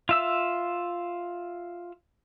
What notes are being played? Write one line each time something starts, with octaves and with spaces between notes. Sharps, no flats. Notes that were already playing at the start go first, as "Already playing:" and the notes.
F4 E5 E6